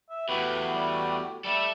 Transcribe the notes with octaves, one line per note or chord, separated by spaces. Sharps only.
E5
E2 A2 F#4 G4 B4
G3
G3 A4 E5